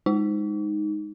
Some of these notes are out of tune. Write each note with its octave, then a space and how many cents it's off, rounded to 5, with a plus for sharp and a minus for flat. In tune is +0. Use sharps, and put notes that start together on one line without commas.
G#3 -15 D#4 +0